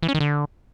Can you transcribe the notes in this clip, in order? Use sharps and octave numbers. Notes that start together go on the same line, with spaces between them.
E3
C#4
D#3
D3